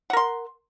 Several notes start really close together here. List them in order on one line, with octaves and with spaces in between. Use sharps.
F#5 A#4 C6